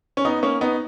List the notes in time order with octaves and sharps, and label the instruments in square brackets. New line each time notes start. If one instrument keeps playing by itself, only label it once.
[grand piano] C#4
B3 D#4
A#3 C#4
B3 D#4